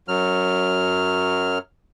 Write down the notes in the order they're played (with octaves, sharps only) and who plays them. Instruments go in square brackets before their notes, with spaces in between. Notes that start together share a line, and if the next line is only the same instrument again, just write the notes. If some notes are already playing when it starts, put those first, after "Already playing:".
[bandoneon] F#2 F#3 F6